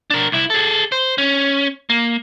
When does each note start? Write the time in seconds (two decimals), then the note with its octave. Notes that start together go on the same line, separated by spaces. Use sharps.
0.10 D4 A#4
0.32 C2 E4
0.50 G#4 A4
0.92 C5
1.18 C#4
1.90 A#3